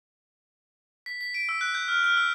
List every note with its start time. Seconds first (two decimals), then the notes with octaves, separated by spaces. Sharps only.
1.06 B6
1.21 B6
1.34 D7
1.49 E6
1.61 F#6
1.75 G6
1.88 F6
2.04 F6
2.17 E6